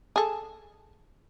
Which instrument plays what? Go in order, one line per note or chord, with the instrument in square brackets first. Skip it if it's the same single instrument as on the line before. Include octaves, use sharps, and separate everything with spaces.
[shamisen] G#4 A4